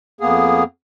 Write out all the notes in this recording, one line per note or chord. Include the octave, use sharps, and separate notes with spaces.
F2 A#3 B3 G#4